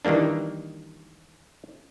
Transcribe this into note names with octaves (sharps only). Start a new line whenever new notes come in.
D#3 E3 G3 A#3 D4